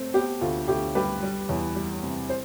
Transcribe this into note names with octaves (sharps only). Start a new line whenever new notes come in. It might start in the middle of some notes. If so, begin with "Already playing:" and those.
Already playing: A3 C4
B3 G4
D2 F4
D2 G4
G3 G4 B4
G3
E2
G3
C3
C5